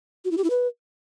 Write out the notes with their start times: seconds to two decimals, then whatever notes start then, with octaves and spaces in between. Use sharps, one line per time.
0.25 F#4
0.31 E4
0.38 G4
0.44 E4
0.50 B4